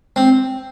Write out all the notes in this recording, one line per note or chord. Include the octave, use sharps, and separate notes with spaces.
C4